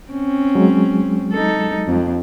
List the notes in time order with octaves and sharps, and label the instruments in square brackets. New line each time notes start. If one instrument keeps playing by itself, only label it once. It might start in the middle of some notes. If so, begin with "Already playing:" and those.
[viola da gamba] C4 C#4
[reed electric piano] F#3 G#3
[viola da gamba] D#4 A4
F2